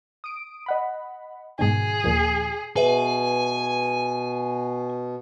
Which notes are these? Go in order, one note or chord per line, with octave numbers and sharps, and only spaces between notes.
D#6 D7
D#5 F#5 B5
G#2 B2 D#3 G#4
D#2 A#2 F3
B2 G#4 B4 E5 G#5